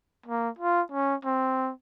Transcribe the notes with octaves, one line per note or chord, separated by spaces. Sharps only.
A#3
F4
C#4
C4